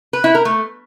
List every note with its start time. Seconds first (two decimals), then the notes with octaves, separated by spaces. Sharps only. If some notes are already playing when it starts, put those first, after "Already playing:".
0.13 B4
0.24 E4
0.35 A#4
0.45 A3